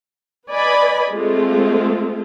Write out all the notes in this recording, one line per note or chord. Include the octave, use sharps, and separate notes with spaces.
B4 D5 D#5 G#5 B5
G#3 A3 C4 F4